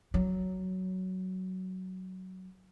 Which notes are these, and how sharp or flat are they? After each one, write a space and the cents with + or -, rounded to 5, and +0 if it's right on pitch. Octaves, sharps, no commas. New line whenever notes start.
F#3 +10